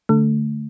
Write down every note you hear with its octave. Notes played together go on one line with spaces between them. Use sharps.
D3 A3